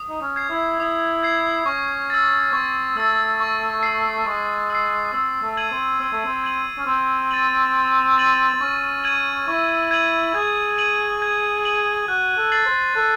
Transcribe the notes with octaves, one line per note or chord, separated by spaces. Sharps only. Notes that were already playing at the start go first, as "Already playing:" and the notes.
Already playing: D#6
D#4
C#4
G#6 C7
E4
E4 D#6
G#6 C7
C#4 C#6
E6 A6
C4 C#6
A3 E6 A6
C#6
E6 C7
G#3 C#6
E6 C7
C4 E6
A3
G#6 D#7 F#7
C4
C4 E6
A3
C4
G#6 D#7 F#7
C#4
C4 E6
A6 D#7 F#7
E6
A6 D#7 F#7
C4
C#4 C#6
G#6 D#7 F#7
E4 C#6
G#6 D#7 F#7
G#4 G#6
D#7 F#7
G#6
D#7 F#7
F#4 F#6
A4
A6 C7 F#7
C5
A4 F#6